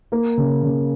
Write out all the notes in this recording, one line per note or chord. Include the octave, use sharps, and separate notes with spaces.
A#3
C#3
C#3